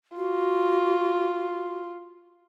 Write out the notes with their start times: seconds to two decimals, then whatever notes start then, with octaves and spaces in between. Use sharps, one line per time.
0.17 F4 F#4